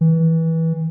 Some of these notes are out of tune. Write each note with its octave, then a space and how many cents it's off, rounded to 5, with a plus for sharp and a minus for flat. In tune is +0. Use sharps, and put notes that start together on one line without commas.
E3 -20